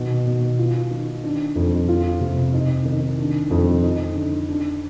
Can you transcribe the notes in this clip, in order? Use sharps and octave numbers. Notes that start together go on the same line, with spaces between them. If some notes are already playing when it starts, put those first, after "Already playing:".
Already playing: B2 D#3
B2
F4
D#3
D4
F2
F4
C3
D#4
D#3
D4
F2
D#4
D3
D4